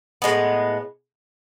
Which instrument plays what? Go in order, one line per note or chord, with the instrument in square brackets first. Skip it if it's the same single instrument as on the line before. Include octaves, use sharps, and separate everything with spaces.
[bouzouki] A2 G#3 B3